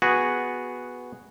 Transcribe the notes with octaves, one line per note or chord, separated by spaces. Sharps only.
B3 F#4 G#4